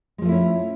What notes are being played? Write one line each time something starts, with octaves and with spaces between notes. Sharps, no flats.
F3 G#3 A3 C#4 E4